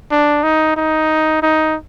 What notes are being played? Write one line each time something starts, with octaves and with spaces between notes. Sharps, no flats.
D4
D#4
D#4
D#4